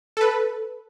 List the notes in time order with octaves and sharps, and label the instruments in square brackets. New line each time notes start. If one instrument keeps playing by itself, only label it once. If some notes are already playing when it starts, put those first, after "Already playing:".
[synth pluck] A4 B4